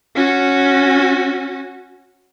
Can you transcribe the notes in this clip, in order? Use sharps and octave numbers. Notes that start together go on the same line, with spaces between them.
C#4 F#4